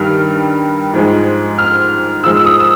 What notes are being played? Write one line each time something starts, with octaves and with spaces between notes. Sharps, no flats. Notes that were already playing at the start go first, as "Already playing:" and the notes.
Already playing: G2 D#3 G3 F6
G#2 F3 G#3
F6
G#2 F3 G#3 E6
E6
D#6
E6